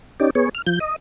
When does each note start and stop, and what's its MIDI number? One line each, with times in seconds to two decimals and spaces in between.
0.20 0.30 61
0.20 0.30 63
0.20 0.30 67
0.20 0.30 74
0.35 0.49 59
0.35 0.49 68
0.35 0.49 73
0.55 0.62 89
0.67 0.79 53
0.67 0.79 91
0.80 0.96 75